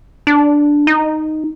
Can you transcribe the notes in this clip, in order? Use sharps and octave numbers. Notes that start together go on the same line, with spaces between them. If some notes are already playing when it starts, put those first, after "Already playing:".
D4
D#4